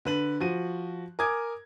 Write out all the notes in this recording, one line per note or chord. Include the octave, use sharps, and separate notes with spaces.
D3 B4 F#7
F3 F#4 D#7
A#4 G#5 D6 D#6 G#6